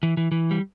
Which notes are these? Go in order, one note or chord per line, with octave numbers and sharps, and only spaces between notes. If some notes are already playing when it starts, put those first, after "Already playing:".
E3
E3
E3
G3